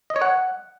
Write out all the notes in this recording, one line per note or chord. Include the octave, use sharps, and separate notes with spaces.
D#5
C#5
F#5